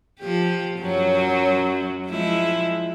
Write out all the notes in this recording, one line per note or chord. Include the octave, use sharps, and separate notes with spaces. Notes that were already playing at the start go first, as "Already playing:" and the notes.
F3 G4
F#2 F#3
F3 G#3 E4